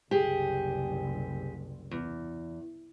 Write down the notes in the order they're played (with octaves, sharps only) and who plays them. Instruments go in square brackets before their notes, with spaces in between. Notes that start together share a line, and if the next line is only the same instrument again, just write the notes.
[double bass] F#1 C2 [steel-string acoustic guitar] G4 G#4
[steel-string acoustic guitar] E2